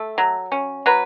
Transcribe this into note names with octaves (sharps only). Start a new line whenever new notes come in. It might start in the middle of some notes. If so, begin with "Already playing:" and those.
Already playing: A3 A4
F#3
C#4
F#3 B4